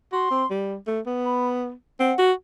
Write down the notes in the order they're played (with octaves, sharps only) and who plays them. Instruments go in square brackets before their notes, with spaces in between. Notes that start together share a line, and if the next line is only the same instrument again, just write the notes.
[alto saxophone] F#4 [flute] C6
[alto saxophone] C4
G3
A3
B3
[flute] B5
[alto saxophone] C4 [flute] F#5
[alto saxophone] F#4